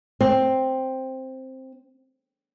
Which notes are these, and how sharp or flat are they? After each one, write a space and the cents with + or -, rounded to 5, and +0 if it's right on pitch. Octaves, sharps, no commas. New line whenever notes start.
C4 +5